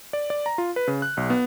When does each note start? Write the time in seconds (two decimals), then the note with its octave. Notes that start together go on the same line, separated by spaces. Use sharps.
0.13 D5
0.30 D5
0.46 A#5
0.58 F4
0.76 B4
0.88 C#3
1.02 F#6
1.17 B1
1.30 B3